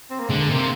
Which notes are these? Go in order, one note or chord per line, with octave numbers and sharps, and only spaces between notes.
C4
A#3
D3 G#3
C3 A#3